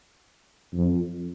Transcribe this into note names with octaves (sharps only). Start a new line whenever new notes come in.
F2